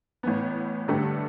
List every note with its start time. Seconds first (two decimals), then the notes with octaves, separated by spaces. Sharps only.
0.23 A1 A2 E3 B3
0.88 G2 D3 A3 G4